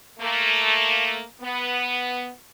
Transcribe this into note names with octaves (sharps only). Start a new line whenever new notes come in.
A3 A#3
B3